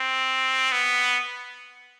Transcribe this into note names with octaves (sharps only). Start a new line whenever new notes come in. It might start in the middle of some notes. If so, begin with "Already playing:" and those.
Already playing: C4
B3